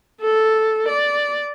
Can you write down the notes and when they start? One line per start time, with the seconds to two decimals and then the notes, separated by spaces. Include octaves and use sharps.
0.21 A4
0.89 D5